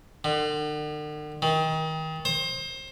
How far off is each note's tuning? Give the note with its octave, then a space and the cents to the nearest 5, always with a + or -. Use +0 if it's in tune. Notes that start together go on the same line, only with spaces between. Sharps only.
D3 +45
D#3 +30
C5 +25